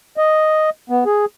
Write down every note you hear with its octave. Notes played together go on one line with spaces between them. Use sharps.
D#5
B3
G#4